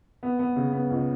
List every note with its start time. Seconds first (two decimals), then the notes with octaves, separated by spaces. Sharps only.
0.23 B3
0.39 B3
0.56 C#3
0.73 B3
0.90 C#2